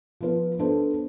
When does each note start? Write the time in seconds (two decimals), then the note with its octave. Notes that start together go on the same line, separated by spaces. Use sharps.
0.21 F3 B3 F4 B4
0.59 B3 D4 A4 C5